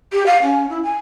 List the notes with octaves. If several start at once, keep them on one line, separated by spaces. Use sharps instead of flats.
G4
F5
C#4
E4
G#5